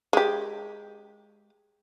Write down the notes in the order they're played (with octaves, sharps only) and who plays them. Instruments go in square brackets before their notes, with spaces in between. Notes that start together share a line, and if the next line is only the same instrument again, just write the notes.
[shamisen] G#3 G4